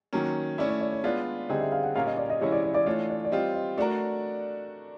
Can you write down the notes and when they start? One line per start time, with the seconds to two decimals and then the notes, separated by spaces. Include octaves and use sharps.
0.13 D#3 F#3 A#3 C#4
0.58 A3 C#4 E4 D5
0.69 C#5
0.81 D5
0.93 C#5
1.04 G#3 B3 D4 F4 D5
1.49 D3 G3 C4 D#4 G#4 D#5
1.61 E5
1.72 F5
1.84 F#5
1.95 A#2 G3 A#3 C#4 F4 F5
2.07 D#5
2.17 D5
2.30 D#5
2.41 C3 E3 G#3 C#4 E4 C#5
2.52 D5
2.64 D5
2.74 D5
2.86 E3 A3 D4 F4 C#5
3.10 D5
3.25 D5
3.32 G3 C4 F4 D#5
3.55 D#5
3.77 A3 D4 F#4 A#4 D5